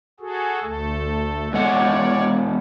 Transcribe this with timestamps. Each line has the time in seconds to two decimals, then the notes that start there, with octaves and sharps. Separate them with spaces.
0.20 F#4 G#4 A4
0.63 D2 A3 A4
1.53 E2 G#3 C#5 D5 F#5